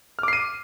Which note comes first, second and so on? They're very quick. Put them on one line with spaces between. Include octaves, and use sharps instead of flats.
F6 D6 C7 D#7